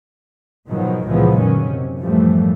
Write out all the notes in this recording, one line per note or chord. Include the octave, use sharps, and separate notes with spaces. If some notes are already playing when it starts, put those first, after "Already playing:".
G#2 B2 D#3 F3 F#3
C#2 A#2 E3 F3 G#3 B3
F#1 D3 D#3 F#3 C#4
C3
F#2 A2 E3 F3 G3 A3